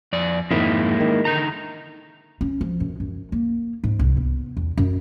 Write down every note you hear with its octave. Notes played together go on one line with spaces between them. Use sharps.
F2 D5
F2 G#2 D#3 G#3 A#3 E4
D#3
D3 D#4 A#5
C#4
F3
F#2
F#2
A#3
G#2
C2
B3
E2
F#2